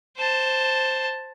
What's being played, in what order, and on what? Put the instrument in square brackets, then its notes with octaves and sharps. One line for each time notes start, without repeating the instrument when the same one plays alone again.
[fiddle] C5 A5